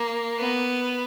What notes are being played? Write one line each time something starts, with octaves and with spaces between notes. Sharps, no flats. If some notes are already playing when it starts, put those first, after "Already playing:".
Already playing: A#3
B3